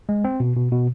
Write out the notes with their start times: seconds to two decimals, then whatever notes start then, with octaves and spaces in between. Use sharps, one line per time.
0.09 G#3
0.24 C4
0.40 B2
0.56 B2
0.72 B2